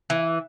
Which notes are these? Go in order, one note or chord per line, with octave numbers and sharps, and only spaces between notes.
E3